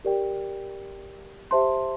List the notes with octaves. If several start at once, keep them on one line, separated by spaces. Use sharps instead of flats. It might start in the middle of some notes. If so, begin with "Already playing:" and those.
G4 A#4 D5 G5
G4 C5 E5 A5 C6